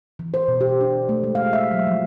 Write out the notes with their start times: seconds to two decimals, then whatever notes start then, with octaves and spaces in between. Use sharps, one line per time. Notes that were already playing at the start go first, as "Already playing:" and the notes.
0.19 E3
0.34 C5
0.48 B2
0.61 G4
0.81 D4
1.09 A3
1.24 G#3
1.35 F5
1.53 E5
1.71 F#3
1.87 F3